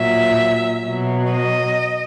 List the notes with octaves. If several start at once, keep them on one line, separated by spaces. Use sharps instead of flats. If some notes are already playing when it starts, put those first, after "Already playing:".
Already playing: A#2 F#3 E5
B2 F#3
D#5